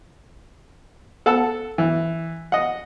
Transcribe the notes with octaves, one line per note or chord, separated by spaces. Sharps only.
A4 F#5 A5 E6
E3
D#5 F#5